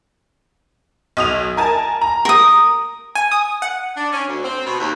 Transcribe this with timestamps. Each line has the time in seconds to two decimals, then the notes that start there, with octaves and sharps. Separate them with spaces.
1.17 B1 D#6 F7
1.57 A#4 G#5 A5
2.02 A#5
2.25 A#4 D#6
3.15 G#5
3.32 D#6
3.62 F#5
3.97 D4
4.12 C#4
4.28 D2
4.44 C4
4.66 B2
4.79 D#2